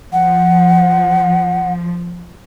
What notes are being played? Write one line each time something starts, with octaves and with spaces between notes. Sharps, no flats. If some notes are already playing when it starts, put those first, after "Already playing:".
F3 F#5